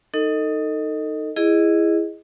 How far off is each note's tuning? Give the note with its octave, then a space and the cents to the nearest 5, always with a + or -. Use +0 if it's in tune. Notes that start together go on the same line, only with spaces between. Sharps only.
D#4 +0 A4 +25 D#5 +0
E4 +15 G#4 -10 D#5 +0